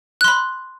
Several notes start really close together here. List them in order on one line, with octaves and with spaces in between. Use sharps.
F#6 C6 B5